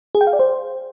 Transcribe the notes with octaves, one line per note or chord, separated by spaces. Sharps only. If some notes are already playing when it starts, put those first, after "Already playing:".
G#4
G5
F5
D5
C5